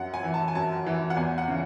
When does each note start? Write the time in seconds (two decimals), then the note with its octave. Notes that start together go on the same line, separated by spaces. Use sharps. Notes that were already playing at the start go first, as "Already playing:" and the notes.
Already playing: F#2 F#5
0.14 G#5
0.24 E3
0.34 A5
0.48 G#5
0.55 F#2 A5
0.86 E3
1.10 F#5
1.16 E2 G#5
1.38 F#5
1.48 C#3 E3